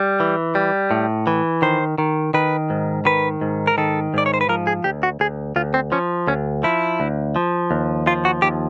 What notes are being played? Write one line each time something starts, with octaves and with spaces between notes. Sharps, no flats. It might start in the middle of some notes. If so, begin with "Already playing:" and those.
Already playing: G3
E3
G3
A2
E3
D#3 C5
D#3
D#3 B4
G#2
D#3 B4
G#2
A#4
D#3 A4
G#2 D5
C#5
C5
B4
F3 A#4
G#4
D2 G4
F#4
D2 G#4
D2 F4
C4
F3 C#4
D2 C#4
F3 E4
D2
F3
D#2
F3 F4
F#4
D#2 G4